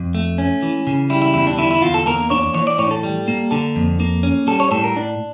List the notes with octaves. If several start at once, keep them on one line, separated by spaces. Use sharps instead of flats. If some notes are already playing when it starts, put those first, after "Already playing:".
Already playing: F2
A3
C#4
E3
C#3
G3 E4
E4
E2 E4
D4
D3 E4
E4
E2 F4
A4
A#3 A#4
D4 C#5
E3 C#5
D5
A2 C#5
A4
G3
A#3
D3 A4
F2
A#3
C#4
G3 A4
C#5
A2 A4
A#4
D4